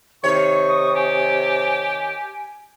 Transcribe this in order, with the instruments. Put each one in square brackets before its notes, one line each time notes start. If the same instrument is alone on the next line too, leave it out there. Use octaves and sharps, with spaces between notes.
[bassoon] C3 [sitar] D#3 C#5 [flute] C#6
[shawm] D#6
[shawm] G4 [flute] G#5